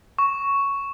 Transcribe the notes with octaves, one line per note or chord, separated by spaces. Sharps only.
C#6